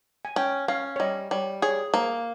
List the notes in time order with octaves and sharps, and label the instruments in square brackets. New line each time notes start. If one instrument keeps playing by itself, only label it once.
[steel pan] G#5
[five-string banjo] C#4 [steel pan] G5
[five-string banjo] C#4 [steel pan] F5
[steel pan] C#5
[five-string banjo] G3 [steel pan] D#5
[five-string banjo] G3 [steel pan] C#5
[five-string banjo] G#4 [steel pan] C#5
[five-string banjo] A#3 [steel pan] C5